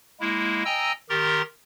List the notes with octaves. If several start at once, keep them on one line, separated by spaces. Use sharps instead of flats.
G#3 A#3 E4
D#5 G5 G#5 A#5 E6
D#3 G4 A#4 A#5 C6 A6